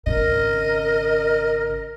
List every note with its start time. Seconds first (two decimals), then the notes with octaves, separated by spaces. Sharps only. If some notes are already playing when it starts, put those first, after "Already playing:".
0.07 G#1 C#3 A#4 D#5